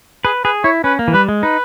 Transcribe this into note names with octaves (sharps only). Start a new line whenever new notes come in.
G#4 B4
G#4 B4
E4 C#5
C#4 B4
A#3
E3
G3 B4
G#3
D#4 B4